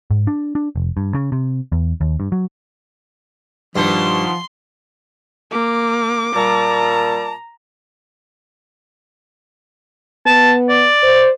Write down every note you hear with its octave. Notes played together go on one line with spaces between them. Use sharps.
G#2
D4
D4
F1
G2
C#3
C3
E2
D#2
G2
F#3
G2 B2 D#3 F3 D#4 C6
A#3 D6
A#2 G3 A5 A#5
B3 A5
D5
C5